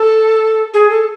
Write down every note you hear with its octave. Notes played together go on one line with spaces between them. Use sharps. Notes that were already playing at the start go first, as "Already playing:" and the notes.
Already playing: A4
G#4
A4